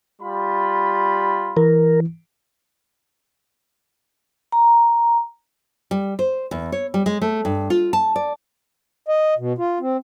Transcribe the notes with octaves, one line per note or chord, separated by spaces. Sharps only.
G3 F4 B5
E3 A#4
A#5
G3
C5
E2
C#5
G3
G#3
A3
G2
F4
A5
D5
D#5
B2
F4
C4